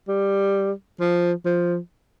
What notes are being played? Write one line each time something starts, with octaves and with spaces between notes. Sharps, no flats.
G3
F3
F3